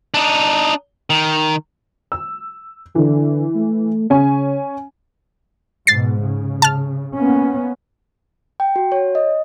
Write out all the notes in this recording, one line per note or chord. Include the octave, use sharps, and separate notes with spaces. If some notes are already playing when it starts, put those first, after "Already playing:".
D4 D#4
D#3
E6
D3 E3
A3
C#3 C#4 G#5
G#2 B2 A6 C7
C#3
A5 F6
A#3 B3 C#4
G5
F#4
C#5
D#5